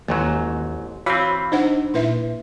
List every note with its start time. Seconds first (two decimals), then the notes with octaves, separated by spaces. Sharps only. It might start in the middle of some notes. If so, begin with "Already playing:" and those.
0.08 A1 D#2 G#2 F#3 A#3
1.06 E3 C4 F#4 C#5 F5 B5
1.52 D4 D#4 C5 F#5
1.94 A#2 E4 B4 E5